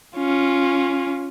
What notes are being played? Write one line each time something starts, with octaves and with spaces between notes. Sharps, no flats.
C#4 F4